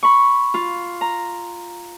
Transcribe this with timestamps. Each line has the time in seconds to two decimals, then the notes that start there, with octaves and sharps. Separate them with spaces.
0.03 B5 C#6
0.54 F4
1.01 A#5